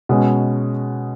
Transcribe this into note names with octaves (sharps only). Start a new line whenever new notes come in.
B2 G#3 C#4